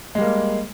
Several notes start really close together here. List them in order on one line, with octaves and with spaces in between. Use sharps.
G#3 G3 A#3